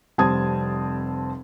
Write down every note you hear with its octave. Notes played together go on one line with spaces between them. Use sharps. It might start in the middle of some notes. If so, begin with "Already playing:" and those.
F1 G3 C4 A5 D#6 G#6